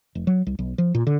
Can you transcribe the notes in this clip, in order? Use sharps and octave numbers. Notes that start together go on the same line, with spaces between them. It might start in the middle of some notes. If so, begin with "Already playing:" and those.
F1
F#3
C2
B1
F3
A#2
D3